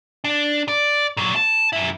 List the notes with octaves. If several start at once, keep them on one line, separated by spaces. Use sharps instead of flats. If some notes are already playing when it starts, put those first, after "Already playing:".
D4
D5
A#2 F#3
A5
F#2 E4